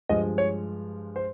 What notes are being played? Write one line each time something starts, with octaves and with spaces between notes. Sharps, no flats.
G2 F3 G#3 D#5
C#5
C5